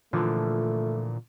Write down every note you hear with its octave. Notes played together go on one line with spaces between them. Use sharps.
A#2 D3 E3 F3 A3 F4